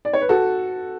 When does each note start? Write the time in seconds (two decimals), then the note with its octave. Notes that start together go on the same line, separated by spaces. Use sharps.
0.05 D5
0.13 C#5
0.21 B4
0.29 F#4 A4